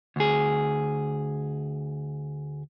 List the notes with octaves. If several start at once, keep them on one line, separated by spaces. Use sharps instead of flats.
D2 G#4